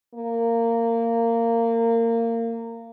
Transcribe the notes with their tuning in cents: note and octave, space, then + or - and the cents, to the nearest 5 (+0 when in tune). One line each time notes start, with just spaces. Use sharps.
A#3 -20